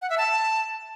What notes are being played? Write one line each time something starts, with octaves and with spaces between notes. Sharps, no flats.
F#5
E5
A5